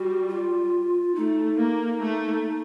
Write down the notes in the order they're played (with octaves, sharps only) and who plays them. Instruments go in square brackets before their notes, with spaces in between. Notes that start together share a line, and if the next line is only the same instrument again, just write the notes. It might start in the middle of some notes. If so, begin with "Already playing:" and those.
Already playing: [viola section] G3 [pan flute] F#4
[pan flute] F4
[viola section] A3 [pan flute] D#4
[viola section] A#3
A3